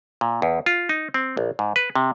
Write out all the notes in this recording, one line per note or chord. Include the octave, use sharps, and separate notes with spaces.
A#2
E2
F4
D#4
C4
A#1
G#2
B4
C3